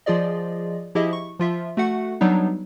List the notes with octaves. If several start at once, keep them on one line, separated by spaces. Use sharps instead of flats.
F3 F4 G#4 D5 D#5
F3 E4 G4 G#4 D#5 E5
C#6
F3 F4 E5
A3 F#4 F#5
F#3 G3 B3 D4 D#4